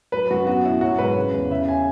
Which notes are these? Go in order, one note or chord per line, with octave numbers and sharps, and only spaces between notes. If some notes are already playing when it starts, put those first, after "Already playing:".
F#3 B4
F#2 F#4
B3 F#4
B2 E4
F#3 F#4
G#2 B4
C#3
E2
C#3 E5
G#5